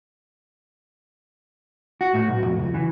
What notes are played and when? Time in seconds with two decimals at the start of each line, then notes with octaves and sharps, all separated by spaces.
2.01 F#4
2.14 A2
2.28 B1
2.46 F2
2.59 C#2
2.74 E3